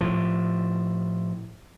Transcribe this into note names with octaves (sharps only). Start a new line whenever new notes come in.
A2 F3